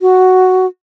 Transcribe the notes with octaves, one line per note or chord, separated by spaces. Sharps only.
F#4